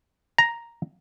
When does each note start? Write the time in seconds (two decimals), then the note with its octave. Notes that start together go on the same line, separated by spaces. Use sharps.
0.38 A#5